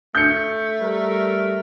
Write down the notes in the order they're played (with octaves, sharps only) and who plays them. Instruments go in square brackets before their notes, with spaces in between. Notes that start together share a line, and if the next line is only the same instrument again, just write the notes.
[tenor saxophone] A3 [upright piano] G6 C#7
[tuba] G3 [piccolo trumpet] A#4